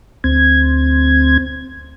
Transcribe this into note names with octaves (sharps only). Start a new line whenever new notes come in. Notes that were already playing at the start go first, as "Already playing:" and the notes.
D2 C4 G#6